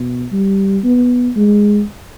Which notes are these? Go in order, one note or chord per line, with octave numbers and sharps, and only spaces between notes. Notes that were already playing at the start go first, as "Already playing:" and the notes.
Already playing: B2
G3
B3
G#3